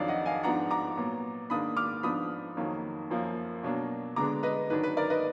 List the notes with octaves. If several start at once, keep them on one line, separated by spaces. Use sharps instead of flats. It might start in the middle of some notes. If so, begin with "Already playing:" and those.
Already playing: F2 D#3 F#3 D4 D5 F5
D#5 F#5
F5 G#5
G#2 F3 B3 D4 F#5 A#5
A#5 D6
A#2 F#3 B3
G#2 D#3 A#3 D4 B5 D#6
D6 F6
G#2 F3 B3 D4 B5 D#6
F2 D#3 F#3 A#3
F#2 F3 A#3
B2 F#3 A#3 D4
D3 G#3 B3 D4 A#5 D6
B4 D#5
G#2 D#3 F#3 D4 B4
B4
A#4 D5
B4 D#5